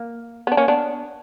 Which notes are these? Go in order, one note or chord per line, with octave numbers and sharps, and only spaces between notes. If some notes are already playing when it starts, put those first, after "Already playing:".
Already playing: A#3
B3 D4
A#3 C#4
B3 D4